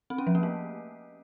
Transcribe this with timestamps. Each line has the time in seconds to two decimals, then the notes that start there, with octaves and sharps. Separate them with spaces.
0.10 C4
0.18 C#4
0.27 F3
0.35 A#3
0.43 A3